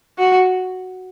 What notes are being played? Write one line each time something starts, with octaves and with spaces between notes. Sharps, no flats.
F#4